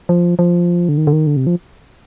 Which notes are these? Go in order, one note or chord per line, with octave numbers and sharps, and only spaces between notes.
F3
F3
D3
D#3
D3
D#3
D3
C3
F3